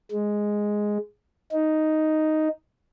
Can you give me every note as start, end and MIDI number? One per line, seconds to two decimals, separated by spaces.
0.11 0.97 56
1.52 2.48 63